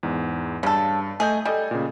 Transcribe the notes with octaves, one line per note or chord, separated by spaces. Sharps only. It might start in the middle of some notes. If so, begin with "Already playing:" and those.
E2 G#2
G2 C#3 A4
A3 G#4 D#5 G6
G3 A4 D#5 G#5
A#2 C#3